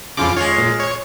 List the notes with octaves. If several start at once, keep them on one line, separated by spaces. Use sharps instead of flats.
F2 C#3 F4 D6
G#3 F4 C#5
A#2
C#5